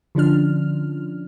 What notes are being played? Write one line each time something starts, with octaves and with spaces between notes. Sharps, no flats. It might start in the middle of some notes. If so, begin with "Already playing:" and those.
D3 F3 C#4 D4 F6